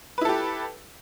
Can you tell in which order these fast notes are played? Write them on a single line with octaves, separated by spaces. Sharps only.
B4 E4 A4 G4